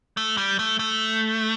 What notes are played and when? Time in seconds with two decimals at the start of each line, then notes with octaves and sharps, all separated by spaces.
0.17 A3
0.38 G3
0.59 A3
0.79 A3